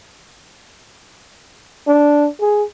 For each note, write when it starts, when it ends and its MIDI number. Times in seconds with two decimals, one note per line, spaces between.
1.87 2.28 62
2.40 2.64 68